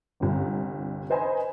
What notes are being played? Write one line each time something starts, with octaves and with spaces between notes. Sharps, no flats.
G1 C2
B4 C5 D#5 G#5 A#5 B5